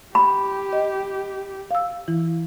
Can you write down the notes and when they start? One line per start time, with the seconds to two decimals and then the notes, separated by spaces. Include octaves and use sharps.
0.15 G4 B5
0.73 D#5
1.71 F5 E6
2.08 E3 E4